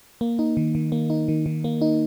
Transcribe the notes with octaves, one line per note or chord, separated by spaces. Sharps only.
A#3
D#4
D#3
D#3
A#3
D#4
D#3
D#3
A#3
D#4